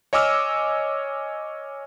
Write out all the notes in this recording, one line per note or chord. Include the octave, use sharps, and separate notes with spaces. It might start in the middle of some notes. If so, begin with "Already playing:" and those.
C#5 D#5 G#5 D6 E6 F6